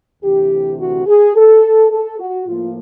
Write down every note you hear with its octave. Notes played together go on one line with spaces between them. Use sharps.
D2 C3 E3 G4
F#4
G#4
A4
A4
F#4
A2 F3 A#3 F4